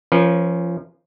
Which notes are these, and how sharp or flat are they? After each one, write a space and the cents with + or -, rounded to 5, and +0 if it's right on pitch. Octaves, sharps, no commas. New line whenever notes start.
F3 -20 C#4 +0 A#4 +45